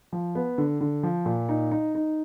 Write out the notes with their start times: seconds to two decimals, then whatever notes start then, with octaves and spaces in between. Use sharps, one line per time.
0.13 F3
0.35 B3
0.58 D3
0.81 D3
1.03 F3
1.26 A#2
1.49 D#4
1.71 D#4
1.95 D#4